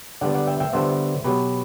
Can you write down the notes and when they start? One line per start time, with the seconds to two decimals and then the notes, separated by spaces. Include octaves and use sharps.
0.21 D3 G3 B3 D5 F#5
0.35 D5 F#5
0.47 E5 G5
0.60 E5 G5
0.73 D3 G3 B3 C5 E5
1.24 B2 F#3 B3 G4 B4